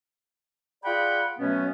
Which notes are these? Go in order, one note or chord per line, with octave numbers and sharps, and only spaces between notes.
F4 G#4 D5 F#5 G5 B5
B2 F#3 A3 B3 C#4